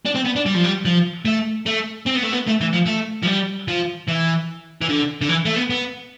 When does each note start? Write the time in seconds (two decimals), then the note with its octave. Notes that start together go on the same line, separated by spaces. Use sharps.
0.05 D4
0.15 C4
0.25 B3
0.36 D4
0.46 G3
0.55 F3
0.64 G3
0.85 F3
1.25 A3
1.66 A3
2.07 C4
2.16 B3
2.23 A3
2.33 B3
2.47 A3
2.61 E3
2.73 F3
2.87 A3
3.23 F3
3.27 G3
3.68 F3
4.08 E3
4.81 E3
4.89 D3
5.21 D3
5.29 E3
5.45 A3
5.56 B3
5.70 B3